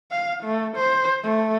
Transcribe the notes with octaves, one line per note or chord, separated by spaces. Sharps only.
F5
A3
C5
A3